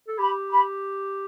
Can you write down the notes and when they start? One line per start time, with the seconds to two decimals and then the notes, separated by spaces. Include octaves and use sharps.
0.08 A4
0.19 G4 B5
0.50 B5